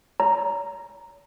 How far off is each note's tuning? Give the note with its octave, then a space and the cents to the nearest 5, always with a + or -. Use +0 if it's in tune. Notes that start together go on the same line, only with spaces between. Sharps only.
C#5 +45 A#5 +0